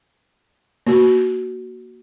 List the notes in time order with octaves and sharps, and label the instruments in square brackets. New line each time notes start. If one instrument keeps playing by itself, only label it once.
[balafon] A#3 F#4